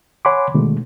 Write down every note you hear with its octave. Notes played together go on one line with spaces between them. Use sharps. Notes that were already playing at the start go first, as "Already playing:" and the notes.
C#5 F#5 G#5 B5 C6 D6
B2 D3 D#3 G#3 A3